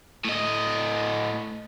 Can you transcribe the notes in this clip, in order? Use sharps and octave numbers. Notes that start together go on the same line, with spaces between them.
A2 D#5